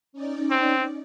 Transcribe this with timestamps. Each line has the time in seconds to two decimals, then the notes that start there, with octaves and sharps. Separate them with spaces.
0.13 C#4 D#4 D5
0.51 C4